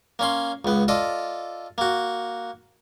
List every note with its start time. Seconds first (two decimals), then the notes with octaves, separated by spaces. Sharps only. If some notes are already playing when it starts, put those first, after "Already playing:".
0.19 A#3 C#4 C6
0.65 C#2 B3
0.88 F4 A4 D5 D#5
1.78 A#3 F#4